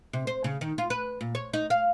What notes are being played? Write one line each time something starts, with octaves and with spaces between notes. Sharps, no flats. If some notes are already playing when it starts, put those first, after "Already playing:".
C3
C5
C#3
D#3
F4
B4
A#2
C#5
D#4
F5